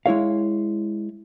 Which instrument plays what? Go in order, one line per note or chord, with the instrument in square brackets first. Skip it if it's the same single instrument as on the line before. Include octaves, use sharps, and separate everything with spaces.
[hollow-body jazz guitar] G#3 E4 C#5 F5